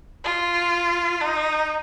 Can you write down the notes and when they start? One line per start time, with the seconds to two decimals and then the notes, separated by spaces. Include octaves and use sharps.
0.24 F4
1.21 D#4